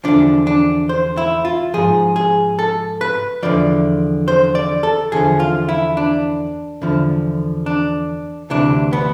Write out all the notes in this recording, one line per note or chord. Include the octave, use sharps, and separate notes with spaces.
E2 D3 F3 D4
D4
C5
E4
F4
G#2 F3 G#4
G#4
A4
B4
E2 D3 F3 D5
C5
D5
A4
E2 D3 F3 G#4
F4
E4
D4
E2 D3 F3
D4
D2 C3 E3 D4
B3